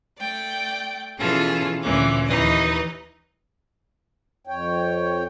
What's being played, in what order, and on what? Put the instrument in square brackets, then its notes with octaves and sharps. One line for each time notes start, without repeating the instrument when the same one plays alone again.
[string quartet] A3 D5 G5
B2 E3 C#4 F4 G#4 A4
D2 A#2 E3 C#4 D6
D#2 E3 D#4 B4 D#5
[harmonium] F2 C#5 G5